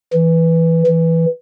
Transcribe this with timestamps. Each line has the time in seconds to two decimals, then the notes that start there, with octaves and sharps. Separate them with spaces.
0.13 E3
0.87 E3